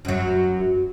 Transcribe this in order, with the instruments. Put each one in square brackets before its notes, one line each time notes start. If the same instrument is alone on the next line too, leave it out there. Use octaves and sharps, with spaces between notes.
[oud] F#2 F#3